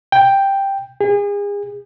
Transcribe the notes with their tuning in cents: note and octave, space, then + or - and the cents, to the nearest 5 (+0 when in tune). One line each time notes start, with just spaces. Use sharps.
G5 +5
G#4 -35